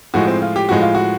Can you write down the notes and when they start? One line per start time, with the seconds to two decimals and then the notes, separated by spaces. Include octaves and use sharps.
0.14 A2 F3 G#3 F#4
0.27 C4
0.42 F4
0.56 G4
0.69 A2 F3 G#3 F#4
0.82 F4
0.95 F#4